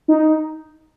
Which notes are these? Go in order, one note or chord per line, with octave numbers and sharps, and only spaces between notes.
D#4